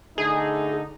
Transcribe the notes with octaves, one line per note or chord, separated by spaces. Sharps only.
D3 A3 D#4 G#4